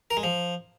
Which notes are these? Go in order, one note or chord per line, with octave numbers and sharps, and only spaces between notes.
A#4
G#3
F3